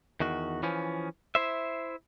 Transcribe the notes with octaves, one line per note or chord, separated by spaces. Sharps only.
E2 D#3 F#4
E3 F3 C#4
E4 C5 E5